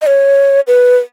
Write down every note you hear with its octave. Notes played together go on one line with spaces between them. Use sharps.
D#5
C#5
B4